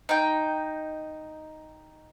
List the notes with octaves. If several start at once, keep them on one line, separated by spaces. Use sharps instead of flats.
D#4 G5